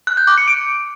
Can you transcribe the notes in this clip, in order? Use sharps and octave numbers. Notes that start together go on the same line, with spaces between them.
F#6
G6
D6
C#7
D7